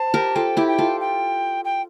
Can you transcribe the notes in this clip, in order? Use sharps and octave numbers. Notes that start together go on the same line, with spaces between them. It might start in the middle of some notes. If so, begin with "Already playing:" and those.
Already playing: C5 A5
G4 A#4
F4 A4 G5
E4 G4
G5
F4 A4
G5
G5